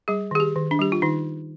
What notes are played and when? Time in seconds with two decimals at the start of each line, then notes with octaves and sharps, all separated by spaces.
0.08 G3 G#4
0.31 D#3 G#4
0.40 G4
0.56 D#3
0.71 D4
0.79 G3 G4
0.92 F4
1.02 D#3 D#4